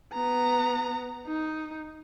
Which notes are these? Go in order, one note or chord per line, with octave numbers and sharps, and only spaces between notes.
B3 A#5
D#4